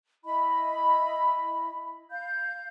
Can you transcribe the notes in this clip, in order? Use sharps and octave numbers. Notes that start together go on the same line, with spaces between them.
E4 D#5 B5
F5 G6